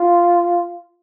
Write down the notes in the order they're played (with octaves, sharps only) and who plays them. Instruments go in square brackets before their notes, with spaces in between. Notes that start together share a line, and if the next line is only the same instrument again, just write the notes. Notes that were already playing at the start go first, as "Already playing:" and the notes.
Already playing: [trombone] F4